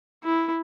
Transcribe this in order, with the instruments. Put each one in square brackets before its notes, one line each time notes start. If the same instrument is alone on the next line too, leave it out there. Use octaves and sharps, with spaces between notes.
[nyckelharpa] E4